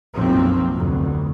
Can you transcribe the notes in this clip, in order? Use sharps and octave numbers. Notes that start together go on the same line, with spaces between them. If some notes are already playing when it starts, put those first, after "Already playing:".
F#1 B1 F3 F#3 A#3 C4
F1 D2 B2